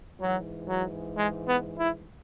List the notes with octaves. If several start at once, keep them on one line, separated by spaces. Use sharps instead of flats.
G#2 E3 F#3
F#3
G#3
B3
E4